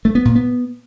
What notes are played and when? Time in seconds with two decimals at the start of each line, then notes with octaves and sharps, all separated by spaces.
0.05 A3
0.15 B3
0.25 A#2
0.35 B3